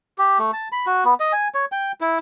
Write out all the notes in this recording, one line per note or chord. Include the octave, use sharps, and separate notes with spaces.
G4
A3
A5
B5
F#4
B3
D#5
G#5
C#5
G5
E4